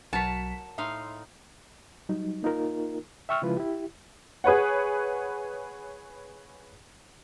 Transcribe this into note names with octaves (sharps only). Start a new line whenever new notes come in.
B1 F#3 F#4 A#4 C#5 A5 B6
A2 D#4 E5 F5 C6
F#3 G3 D#4
A#3 D#4 F4 A#4
E5 G5 C#6 E6 F6
C#3 F3 G#3 E4 F4 B4
E4 G4
G#4 B4 C#5 F#5